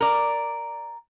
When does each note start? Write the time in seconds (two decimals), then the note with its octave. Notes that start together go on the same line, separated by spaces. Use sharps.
0.01 A#4 D5